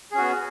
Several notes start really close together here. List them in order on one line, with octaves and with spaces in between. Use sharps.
G#4 C#4 F#4 B3